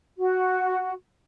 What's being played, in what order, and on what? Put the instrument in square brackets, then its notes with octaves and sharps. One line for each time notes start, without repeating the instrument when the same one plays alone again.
[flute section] F#4